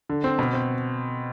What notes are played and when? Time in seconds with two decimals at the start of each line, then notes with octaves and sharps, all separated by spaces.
0.09 D3
0.24 C4
0.39 B2
0.53 C4